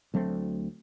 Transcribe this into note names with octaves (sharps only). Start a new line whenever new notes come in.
D2 F#3 A3 C4